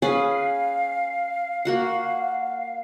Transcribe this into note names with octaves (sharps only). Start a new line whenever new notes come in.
C#4 G#4 B4 F5
A#3 F#4 F#5